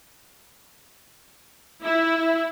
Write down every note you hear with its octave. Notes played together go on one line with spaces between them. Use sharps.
E4